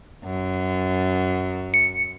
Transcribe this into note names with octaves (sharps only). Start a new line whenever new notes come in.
F#2
C#7